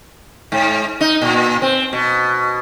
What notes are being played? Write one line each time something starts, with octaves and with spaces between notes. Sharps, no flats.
G#2
D#4
A#2
C4
B2